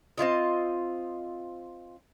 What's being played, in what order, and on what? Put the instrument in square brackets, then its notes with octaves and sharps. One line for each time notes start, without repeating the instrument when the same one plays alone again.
[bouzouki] C4 E4 F4 D#5